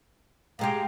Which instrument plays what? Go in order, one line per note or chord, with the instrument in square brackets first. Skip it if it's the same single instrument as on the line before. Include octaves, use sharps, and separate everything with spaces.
[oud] A2 G#3 G4 [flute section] F5 G5 A#5